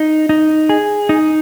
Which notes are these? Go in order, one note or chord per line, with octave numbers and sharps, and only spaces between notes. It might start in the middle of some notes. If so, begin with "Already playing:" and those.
Already playing: D#4
D#4
G#4
D#4